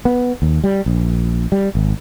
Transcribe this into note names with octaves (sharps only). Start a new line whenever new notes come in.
B3
D#2
G3
A#1
G3
G#1